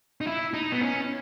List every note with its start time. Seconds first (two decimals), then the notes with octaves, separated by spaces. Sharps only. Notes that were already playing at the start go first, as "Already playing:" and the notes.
0.21 D#4
0.27 E4
0.54 D#4
0.72 B3
0.81 C#4